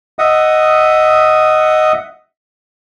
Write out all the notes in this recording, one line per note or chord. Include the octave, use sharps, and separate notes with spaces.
D#5 E5 F#5 D#6